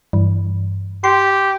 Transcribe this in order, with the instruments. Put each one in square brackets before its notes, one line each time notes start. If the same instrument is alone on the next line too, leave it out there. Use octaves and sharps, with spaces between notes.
[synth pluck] G2 E3
[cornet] G4 [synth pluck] C6